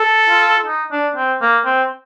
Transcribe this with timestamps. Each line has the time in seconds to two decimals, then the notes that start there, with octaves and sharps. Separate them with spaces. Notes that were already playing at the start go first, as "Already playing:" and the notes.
Already playing: A4
0.29 F4
0.66 D#4
0.91 D4
1.16 C4
1.41 A#3
1.65 C4